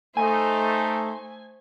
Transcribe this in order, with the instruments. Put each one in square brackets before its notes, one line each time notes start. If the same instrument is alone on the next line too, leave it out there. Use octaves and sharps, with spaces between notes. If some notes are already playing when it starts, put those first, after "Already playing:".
[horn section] A3 [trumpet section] D#4 [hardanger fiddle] C5 [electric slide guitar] G#5